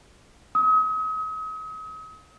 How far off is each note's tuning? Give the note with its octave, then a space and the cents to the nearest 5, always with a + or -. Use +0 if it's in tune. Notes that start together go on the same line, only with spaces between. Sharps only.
D#6 +40